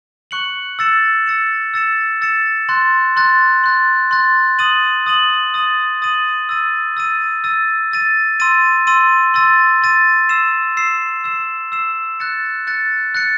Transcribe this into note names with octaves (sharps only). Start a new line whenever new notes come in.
C#6 F#6 C#7 F#7
E6 A6 C#7 E7
E6 A6 C#7 E7
E6 A6 C#7 E7
E6 A6 C#7 E7
C6 F#6 A6
C6 F#6 A6
C6 F#6 A6
C6 F#6 A6
D#6 A6 D#7 F#7
D#6 A6 D#7 F#7
D#6 A6 D#7 F#7
D#6 A6 D#7 F#7
E6 A6 D#7
E6 A6 D#7
E6 A6 D#7
E6 A6 D#7
C6 E6 A6 D#7
C6 E6 A6 D#7
C6 E6 A6 D#7
C6 E6 A6 D#7
E6 C7 E7
E6 C7 E7
E6 C7 E7
E6 C7 E7
F#6 A6 C#7
F#6 A6 C#7
F#6 A6 C#7